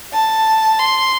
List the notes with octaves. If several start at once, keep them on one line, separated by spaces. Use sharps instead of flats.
A5
C6